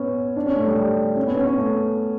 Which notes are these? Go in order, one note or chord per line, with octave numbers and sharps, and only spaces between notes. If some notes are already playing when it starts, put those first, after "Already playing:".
Already playing: B3 C#4
D4
C#4
A3
G3
G3
C#4
B3
C#4
C#4
A3